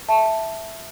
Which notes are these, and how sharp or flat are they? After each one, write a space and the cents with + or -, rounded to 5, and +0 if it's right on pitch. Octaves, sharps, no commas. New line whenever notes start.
E5 +0 A5 +0